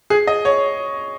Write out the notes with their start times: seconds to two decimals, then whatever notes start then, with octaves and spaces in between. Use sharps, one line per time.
0.10 G#4
0.27 D#5
0.45 C#5